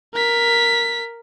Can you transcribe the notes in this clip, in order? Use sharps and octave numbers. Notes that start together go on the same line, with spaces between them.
A#4 B6